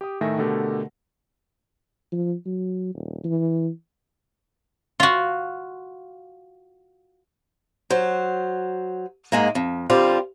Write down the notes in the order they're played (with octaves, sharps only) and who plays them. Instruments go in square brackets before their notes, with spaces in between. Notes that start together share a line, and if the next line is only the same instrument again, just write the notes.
[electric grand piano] G4 D6 D#6
A2 D#3 A3 E5 G#5 A#6
B2 D3 A3 G4 A#4
[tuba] F3
F#3
D#1
E3
[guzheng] F4 F#4
[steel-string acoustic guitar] F#3 C5
G#2 G#3 A#3
F2
D3 F3 G3 C4 F4